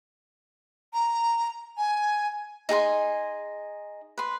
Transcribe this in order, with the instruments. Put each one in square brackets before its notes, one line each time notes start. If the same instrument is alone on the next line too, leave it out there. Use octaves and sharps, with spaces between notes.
[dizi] A#5
G#5
[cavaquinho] D#4 G#4 G#5 C6
B4 C6